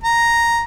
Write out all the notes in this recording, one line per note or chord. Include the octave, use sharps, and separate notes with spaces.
A#5